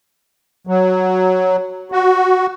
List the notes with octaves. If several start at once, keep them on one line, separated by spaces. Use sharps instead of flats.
F#3
F#4